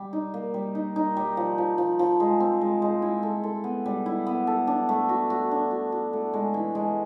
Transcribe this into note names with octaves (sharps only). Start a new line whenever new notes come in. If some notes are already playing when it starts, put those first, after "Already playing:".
Already playing: G3
D#4
A#3
G3
D#4
D#4
G3
F3
F3
F3
F3
G#3
C4
G#3
G#3
E4
A4
A4
B3
G3
E4
B3
A4
D4
A3
F#4
F#4
D4
F#4
F#4
A3
G#3
E3
G#3